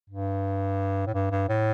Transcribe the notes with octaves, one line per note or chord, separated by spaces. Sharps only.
G2
A2
G2
G2
A2